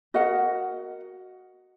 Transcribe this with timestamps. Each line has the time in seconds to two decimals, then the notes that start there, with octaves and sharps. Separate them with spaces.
0.14 F#4 A#4 D#5 F#5